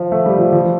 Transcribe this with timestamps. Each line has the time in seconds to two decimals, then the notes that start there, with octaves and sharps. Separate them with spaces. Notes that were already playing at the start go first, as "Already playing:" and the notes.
Already playing: F3
0.12 A3
0.26 G3
0.38 F3
0.53 F3